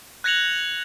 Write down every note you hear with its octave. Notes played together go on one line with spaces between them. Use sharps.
F#6 G#6 A#6 C#7 F7 F#7